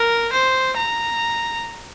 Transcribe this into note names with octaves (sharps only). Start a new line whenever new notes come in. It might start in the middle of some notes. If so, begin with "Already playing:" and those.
Already playing: A#4
C5
A#5